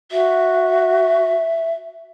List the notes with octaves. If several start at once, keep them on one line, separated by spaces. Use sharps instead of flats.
F#4 E5